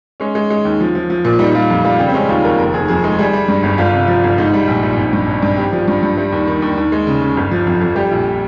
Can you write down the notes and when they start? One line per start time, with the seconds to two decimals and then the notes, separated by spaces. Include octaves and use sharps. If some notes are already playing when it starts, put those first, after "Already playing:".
0.20 G#3 C#4
0.35 G#3
0.50 G#3
0.65 D#2
0.81 F3
0.95 F3
1.10 F3
1.25 A#2
1.39 G3 D#4
1.55 G3 F4
1.70 F2
1.85 G3 F4
1.99 C#3 G4
2.09 C4
2.14 G#3 C#4
2.29 D#2 F4
2.44 D#2 A#4
2.59 F1 A#4
2.74 F1 G#4
2.88 F2 G#4
3.04 G#3
3.19 G3 G#4
3.33 G3
3.48 G2
3.63 G1
3.78 G1 F4
3.94 C3
4.08 F3
4.23 G1
4.38 G#2 D#4
4.53 G3
4.67 A#1
4.83 A#1
4.97 G#1
5.13 G2
5.27 G#1
5.42 G2
5.57 G#1 G4
5.73 F3
5.88 G2
6.03 G2
6.17 G3
6.32 D#2
6.47 D#3
6.62 D#2
6.77 D#2
6.92 G#3
7.07 C#3
7.22 C#3
7.37 G1
7.51 F3
7.67 F2
7.81 F2
7.95 G3 G4
8.11 A#1